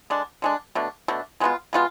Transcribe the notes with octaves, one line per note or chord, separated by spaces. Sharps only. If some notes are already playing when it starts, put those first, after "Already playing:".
D3 G#3 D4
D3 G#3 D4
B2 A3 D4
B2 A3 D4
B2 G#3 B3 F4
B2 G#3 B3 F4